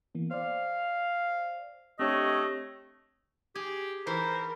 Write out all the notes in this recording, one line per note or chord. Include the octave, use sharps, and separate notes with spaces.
E3 A#3 B3
C5 D5 F5
A3 C4 D4 G4 C#5 D#5
G4 G#4
E3 A#4 C5